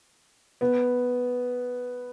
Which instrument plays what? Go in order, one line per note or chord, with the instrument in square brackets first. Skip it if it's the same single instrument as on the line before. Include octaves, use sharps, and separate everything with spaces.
[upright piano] B3